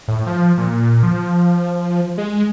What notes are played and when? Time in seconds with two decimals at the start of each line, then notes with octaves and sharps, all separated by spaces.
0.08 A2
0.27 F3
0.58 A#2
1.03 F3
2.18 G#3